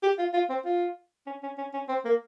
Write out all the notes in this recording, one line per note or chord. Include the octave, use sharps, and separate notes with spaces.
G4
F4
F4
C4
F4
C#4
C#4
C#4
C#4
C4
A#3